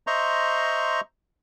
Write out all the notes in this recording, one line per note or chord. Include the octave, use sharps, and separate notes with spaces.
C5 D#5 E5 A#5 C6 C#6